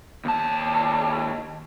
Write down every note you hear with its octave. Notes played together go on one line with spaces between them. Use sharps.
D#2 A5